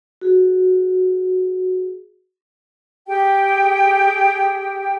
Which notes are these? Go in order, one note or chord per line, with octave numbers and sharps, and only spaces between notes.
F#4 G#4
G4 G#4 G5